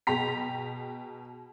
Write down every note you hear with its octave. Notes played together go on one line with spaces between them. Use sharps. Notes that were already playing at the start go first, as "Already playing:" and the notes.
B2 G#4 G5 A#5 B6